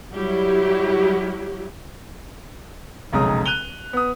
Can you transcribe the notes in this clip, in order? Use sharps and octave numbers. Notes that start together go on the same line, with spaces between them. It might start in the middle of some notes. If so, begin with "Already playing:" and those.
F#3 G3 E4 G4
F1 B1 C#3 G#3 A#5 D#6
F#6 D#7 F7 G7
B3 D#6